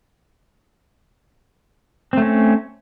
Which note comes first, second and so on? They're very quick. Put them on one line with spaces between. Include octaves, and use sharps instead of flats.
C4 A3 C#4